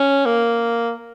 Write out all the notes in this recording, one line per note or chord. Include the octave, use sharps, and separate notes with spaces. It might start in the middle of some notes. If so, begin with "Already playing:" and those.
Already playing: C#4
A#3